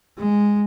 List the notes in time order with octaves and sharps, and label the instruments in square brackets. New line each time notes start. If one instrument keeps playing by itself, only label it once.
[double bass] G#3